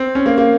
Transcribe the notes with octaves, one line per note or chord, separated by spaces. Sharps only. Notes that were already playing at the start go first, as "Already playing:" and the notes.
Already playing: C4
C#4
A#3
A#3